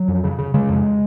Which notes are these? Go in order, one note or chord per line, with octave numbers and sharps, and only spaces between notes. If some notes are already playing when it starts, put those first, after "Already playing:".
Already playing: F#3
F2
C#3
C#3
C#3 G#3
F2